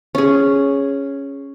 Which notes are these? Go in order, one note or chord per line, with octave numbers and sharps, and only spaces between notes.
C#4 G#4